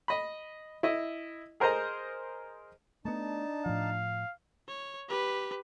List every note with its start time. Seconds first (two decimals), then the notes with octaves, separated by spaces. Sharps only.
0.08 D#5 B5
0.83 E4 D#5
1.60 G#4 A#4 C5 D#5 A#5
3.05 A3 B3 D4 D#4 A5
3.66 A2 F3 F5
4.68 C#5
5.09 G4 B4